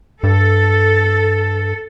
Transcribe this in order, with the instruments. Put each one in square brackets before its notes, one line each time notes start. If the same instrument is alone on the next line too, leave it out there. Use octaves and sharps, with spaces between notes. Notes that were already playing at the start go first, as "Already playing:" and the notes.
[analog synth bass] G2 [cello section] A4